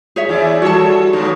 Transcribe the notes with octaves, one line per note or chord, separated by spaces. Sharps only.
G#4 C#5 E5
E2 E4 D5
G3 F#4 A4 C#5 A5
F#3 G#3 B3 D#4